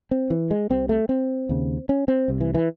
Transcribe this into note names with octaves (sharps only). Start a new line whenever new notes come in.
C4
E3
G#3
C2 C3 C4
A3
C4
D#2 C#3
C#4
C4
C2 C3
E3
E3